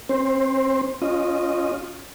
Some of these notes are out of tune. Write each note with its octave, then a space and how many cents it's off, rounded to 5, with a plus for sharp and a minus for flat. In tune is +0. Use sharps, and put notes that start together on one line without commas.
C4 +35 C5 +0
C#4 +0 F4 +0 D#5 -10